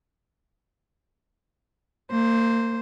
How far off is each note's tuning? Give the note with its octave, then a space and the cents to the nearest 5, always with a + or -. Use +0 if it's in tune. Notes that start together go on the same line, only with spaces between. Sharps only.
A#3 -30 C5 +0